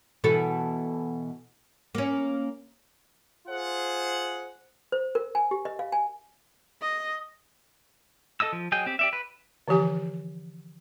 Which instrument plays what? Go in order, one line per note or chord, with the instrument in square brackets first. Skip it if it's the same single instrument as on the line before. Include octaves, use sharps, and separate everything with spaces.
[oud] B2 E3 A4
A#3 C#4
[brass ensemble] F4 G#4 C5 F#5
[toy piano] C5
A#4
G#5
G4
D#5
F5
G#5
[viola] D#5
[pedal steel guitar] A4 D#5 D#6 E6
F3
F#3 G#4 D#5 G5
C4 G4
G4 D5 E5
B4
[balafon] D3 E3 F3 G4 G#5